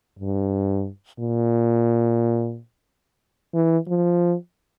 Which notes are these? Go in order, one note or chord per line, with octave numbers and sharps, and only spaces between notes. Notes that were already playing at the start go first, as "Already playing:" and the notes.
G2
A#2
E3
F3